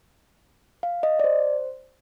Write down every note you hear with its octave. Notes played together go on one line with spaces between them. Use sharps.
F5
D#5
D5
C5